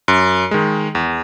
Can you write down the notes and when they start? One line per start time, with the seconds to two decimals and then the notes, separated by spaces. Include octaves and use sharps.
0.08 F#2
0.51 D#3 G#3
0.95 E2